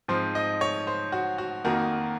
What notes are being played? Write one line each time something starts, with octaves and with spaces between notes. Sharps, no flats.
G#2 F3 C4 C5
D#5
C#5
C5
F#4
F#4
F2 D#3 A#3 F#4